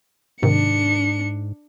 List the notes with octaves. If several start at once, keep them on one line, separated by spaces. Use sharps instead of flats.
G#2 C3 D#3 D4 C#7